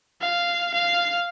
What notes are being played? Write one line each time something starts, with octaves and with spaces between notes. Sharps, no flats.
F5
F5